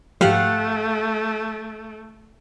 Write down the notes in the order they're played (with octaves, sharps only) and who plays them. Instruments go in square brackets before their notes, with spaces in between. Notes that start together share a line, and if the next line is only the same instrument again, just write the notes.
[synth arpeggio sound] G#2 F3 [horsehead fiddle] A3 [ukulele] G4 [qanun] F5 F#5